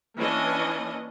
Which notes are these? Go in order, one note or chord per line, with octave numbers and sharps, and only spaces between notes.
E3 A#3 C#4 D4 D#5